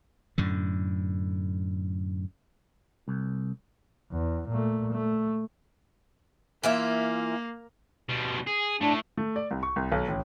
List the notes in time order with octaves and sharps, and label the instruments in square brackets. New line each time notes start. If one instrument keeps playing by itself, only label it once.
[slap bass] F#2 A2 D3
[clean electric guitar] C2
[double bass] E2
A#2 A3
A3
[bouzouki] E3 F4 E5 [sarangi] A#3
[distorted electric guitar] B2 G3
G#4
[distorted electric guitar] A2 A3 [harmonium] D4
[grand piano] A3
D5
C2
C#6
C2
B1
A1